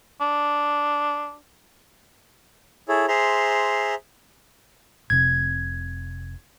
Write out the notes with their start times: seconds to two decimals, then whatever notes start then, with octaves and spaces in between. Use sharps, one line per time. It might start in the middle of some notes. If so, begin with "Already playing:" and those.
0.21 D4
2.89 E4 G#4 A4 C#5
3.08 G#4 C5 E5 A#5 C6
5.10 F1 C3 G#6